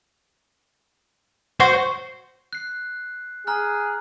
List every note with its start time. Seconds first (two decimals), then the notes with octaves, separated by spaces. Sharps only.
1.60 F#4 C5
2.53 F#6 C7
3.47 G#4 A#5 F6 F#6